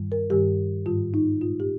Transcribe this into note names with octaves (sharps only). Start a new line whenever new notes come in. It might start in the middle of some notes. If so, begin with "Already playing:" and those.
Already playing: G2 D#3 G3
A#4
G2 D#3 G3 G4
G#2 D#3 G3 F4
D#4
A#2 G#3 F4
G4